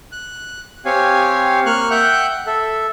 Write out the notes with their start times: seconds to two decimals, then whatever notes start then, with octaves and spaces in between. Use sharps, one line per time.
0.12 F#6
0.85 C4 G4 C#5 F5 G#5
1.66 A#3 C#6 F6 F#6
1.91 E5 F#5 G5 F#6 G6
2.46 A4 E5